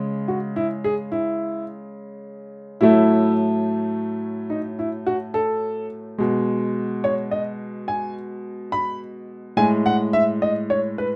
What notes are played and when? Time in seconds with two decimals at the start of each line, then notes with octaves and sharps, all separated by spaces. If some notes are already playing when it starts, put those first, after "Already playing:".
Already playing: C#3 G#3
0.28 F#4
0.56 E4
0.84 G#4
1.12 E4
2.81 A2 F#3 A3 E4
4.50 D#4
4.79 E4
5.07 F#4
5.34 A4
6.18 B2 G#3
7.04 C#5
7.31 D#5
7.88 G#5
8.72 B5
9.57 A2 G#3 G#5
9.86 F#5
10.13 E5
10.42 D#5
10.70 C#5
10.98 B4